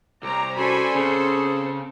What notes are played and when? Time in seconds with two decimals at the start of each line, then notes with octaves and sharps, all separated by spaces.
0.23 C2 C5 C#5 A#5 D6
0.57 C#4 F#4 A4 C5 D5 G#5 B5
0.95 C#3 C4 G#4